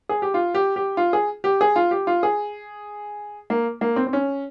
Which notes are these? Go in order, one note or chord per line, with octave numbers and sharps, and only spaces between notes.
G#4
G4
F4
G4
G4
F4
G#4
G4
G#4
F4
G4
F4
G#4
A#3
A#3
C4
C4
C#4